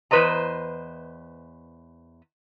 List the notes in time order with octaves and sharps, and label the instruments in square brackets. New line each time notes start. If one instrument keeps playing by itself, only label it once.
[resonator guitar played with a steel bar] E2 G3 B4 C5 D#5 A#5